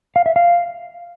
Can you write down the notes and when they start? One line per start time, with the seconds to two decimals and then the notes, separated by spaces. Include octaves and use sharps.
0.16 F5
0.26 E5
0.36 F5